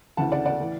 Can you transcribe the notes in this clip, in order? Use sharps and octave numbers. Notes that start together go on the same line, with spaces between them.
D2 C#3 E3 F#5 A5
D5 F#5
D5 F#5
A2 E3